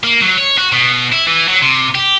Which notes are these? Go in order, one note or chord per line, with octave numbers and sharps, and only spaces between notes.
A#3
F#3
C#5
F#4
B2
E4
E3
F#3
C3
G4